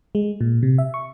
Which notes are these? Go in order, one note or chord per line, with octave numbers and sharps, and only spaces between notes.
G#3
A#2
C3
E5
C#6